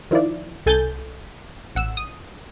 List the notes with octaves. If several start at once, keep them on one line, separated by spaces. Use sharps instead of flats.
D#3 F3 E4 F4 D5
C2 A4 G#5 G6 A6
A1 F#5 E6
D#6